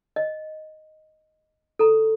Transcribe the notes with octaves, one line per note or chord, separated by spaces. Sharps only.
D#5
A4 A#5